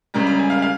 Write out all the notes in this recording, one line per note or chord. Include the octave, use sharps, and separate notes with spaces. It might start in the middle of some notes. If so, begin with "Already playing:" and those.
C#2 C#3 G3 A#5
A#5
G#5
F5
F5